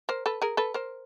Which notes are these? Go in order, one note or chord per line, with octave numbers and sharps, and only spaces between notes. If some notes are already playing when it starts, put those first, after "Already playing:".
A#4 C5
A4 B4
G#4 A#4
A4 B4
A#4 C5